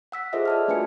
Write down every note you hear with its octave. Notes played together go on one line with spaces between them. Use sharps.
F#5 E6 B6
F4 G#4 A4 C5 D#5 E5
D5 A5 F6
A3 D4 F#4 B4 G#5 C#7